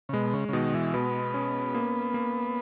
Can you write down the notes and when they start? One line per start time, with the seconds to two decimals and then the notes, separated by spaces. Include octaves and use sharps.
0.09 C#3
0.13 B2 G#3
0.34 C#3
0.49 C#3
0.53 B2 D#3
0.74 E3
0.94 B2 B3
1.34 C#4
1.74 A#3
2.14 A#3